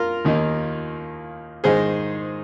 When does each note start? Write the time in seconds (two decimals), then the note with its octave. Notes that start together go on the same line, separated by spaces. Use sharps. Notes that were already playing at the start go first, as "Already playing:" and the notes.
Already playing: F4 A#4
0.25 D#2 D#3 A#3 D#4
1.64 G#2 D#3 G#3 D#4 G#4 C5